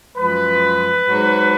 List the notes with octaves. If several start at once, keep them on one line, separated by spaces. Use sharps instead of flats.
F#2 F3 G#3 B4
G#2 F#3